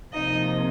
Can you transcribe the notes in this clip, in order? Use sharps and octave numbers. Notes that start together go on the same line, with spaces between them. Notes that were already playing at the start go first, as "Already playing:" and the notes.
C3 F3 A#3 D#4 D#5